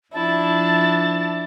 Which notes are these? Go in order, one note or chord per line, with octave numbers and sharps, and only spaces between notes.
F3 D4 E4 A5